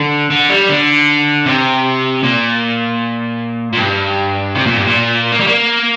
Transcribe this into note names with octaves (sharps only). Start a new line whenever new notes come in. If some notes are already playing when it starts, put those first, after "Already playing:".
Already playing: D3
D3
G3
D3
C3
A#2
A#2
G2
C3
A#2
G2
A#2
A#3
G3
A#3